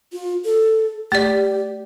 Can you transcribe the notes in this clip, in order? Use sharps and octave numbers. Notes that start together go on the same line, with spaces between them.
F4
A4
A3 G4 D5